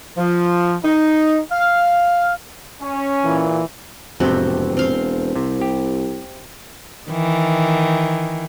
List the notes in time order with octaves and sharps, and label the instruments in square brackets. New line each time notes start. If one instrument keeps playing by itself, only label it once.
[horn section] F3
D#4
F5
[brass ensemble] C#4
[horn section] A#2 E3
[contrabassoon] E1 [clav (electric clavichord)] F2 A2 C3 [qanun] C4 F#4 G4
[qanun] C4 F5 C6
[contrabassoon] C2 [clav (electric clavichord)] C3
[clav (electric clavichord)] G4
[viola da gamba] D#3 E3